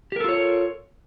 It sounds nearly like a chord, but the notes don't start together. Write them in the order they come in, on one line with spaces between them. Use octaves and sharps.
G4 A#4 A4 F4 C#5